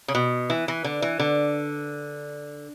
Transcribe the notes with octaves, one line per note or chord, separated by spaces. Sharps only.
C#3
B2
E3
E3
D3
E3
D3